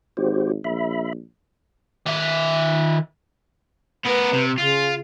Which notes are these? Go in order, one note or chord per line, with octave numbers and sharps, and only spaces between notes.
G#1 F#4 G4 C5
A#1 E5 B5
D#3 E5
B3 A#4 B4
C3
C#3 F4